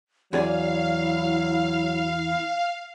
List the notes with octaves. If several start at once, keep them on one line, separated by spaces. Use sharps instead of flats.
E2 F#3 E4 G#4 D5 F5